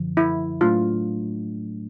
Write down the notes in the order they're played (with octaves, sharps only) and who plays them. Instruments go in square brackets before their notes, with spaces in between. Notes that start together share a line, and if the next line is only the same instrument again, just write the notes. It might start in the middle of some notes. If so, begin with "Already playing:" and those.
Already playing: [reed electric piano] F#2 D3 F3
[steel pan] E4
[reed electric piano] A2 F#3 A3 D4 [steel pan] F4